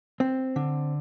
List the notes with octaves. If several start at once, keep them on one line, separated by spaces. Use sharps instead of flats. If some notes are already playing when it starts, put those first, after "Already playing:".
C4
D3